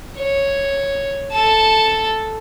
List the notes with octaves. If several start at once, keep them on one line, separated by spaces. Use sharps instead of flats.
C#5
A4 A5